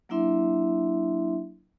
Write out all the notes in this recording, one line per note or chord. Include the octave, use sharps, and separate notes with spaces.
F#3 A#3 D4 E4 E5 C6